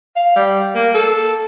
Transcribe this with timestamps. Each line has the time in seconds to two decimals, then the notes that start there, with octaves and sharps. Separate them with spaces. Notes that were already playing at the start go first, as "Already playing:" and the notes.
0.16 F5
0.36 G3
0.75 A#3
0.95 A4